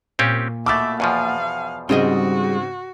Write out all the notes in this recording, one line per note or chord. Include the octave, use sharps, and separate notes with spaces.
A#2 C4 C#4 G4
B2 A3 E5 D6 E6 A6
E2 B2 F3 F5 F#5 G#5
G#2 C#3 G3 C4 F#4 G#4 D#5